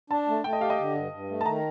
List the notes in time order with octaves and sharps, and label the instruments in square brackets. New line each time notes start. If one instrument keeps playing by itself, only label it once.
[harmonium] D4 [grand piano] A5
[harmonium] A3
[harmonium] A3 [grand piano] G5
[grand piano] D#5
[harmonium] G4 [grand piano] F5
[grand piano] D#5
[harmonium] D3
G2
G2
A3
[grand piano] A5
[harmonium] D#3 [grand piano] A#5